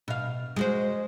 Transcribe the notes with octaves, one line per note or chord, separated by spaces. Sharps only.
B2 F5
G#3 F#4 C5